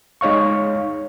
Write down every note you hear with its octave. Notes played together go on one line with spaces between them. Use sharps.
G#3 D#4 C#5 F5 C#6